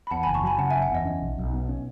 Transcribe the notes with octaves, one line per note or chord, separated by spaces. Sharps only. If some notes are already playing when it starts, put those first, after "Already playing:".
B5
E2 F#5 A5
G#5 B5
F#1
A5 C#6
F#3 G#5 B5
C#3 F#5 A5
E5 G#5
F#1
F#5
E2 D#5
C#4
B1
B1
B2
C#4